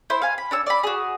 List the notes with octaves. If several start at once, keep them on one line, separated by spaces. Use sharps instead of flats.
E4 C5
F5 G#5
B5
D4 C#5 E6
D5 B5
F#4 G#4